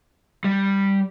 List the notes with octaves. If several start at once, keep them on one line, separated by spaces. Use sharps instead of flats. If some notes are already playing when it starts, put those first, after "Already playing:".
G3